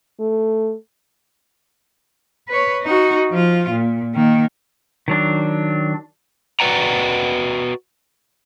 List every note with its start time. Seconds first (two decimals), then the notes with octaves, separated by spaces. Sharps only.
0.19 A3
2.48 B4 C#5
2.82 D#4 F#4
3.30 F3 F4
3.71 A#2
4.15 D#3 A#3
5.08 D#3 F#3 D4
6.60 F#4 B4 D5 F#5 G5 A#5